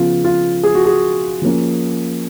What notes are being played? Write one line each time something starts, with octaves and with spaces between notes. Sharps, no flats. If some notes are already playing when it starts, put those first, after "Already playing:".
Already playing: C#3 F3 B3 F4
F4
G#4
F#4
G#4
F3 A#3 C#4